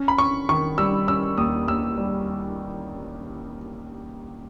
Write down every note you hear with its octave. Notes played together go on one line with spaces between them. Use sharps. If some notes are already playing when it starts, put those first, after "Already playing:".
Already playing: C#4
B5
C#4 C#6
D#3 C#6
G3 E6
C#4 E6
D#2 D#6
D#2 E6
G3